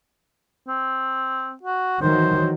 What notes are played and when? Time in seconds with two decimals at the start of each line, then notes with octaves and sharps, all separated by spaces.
0.68 C4
1.63 F#4
2.02 D#3 E3 F#3 C5